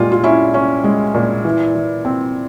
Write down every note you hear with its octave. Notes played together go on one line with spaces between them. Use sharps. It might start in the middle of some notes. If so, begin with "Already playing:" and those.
Already playing: A#2 G#3 F4 G4
F4
C#4 E4
C#4
G#3
A#2
E3
E3
C4